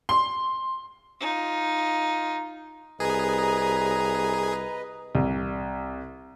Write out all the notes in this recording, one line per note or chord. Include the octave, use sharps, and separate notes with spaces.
C6
D#4 F4
C2 G#4 B4 D#5 A#5
C2